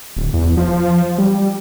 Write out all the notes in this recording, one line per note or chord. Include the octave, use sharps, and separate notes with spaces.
D1
E2
F3
G3